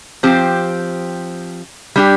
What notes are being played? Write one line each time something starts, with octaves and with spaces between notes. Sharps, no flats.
F3 C4 G4
G3 D4 G4